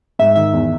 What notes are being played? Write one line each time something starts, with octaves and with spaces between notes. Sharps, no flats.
G#2 E5
D#3 E5
E2